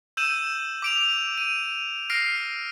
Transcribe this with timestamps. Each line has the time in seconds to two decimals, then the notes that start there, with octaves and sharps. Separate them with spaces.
0.17 E6 G6 D#7 E7 F#7
0.82 D6 D7 F7
1.37 D#7
2.10 F6 A#6 C7 D7